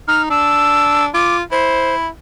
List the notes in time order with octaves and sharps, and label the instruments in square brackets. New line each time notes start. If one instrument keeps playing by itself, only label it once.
[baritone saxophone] D#4 [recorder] F6
[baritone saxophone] D4 [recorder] E6
[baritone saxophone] F4 [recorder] D6
[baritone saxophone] E4 [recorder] C5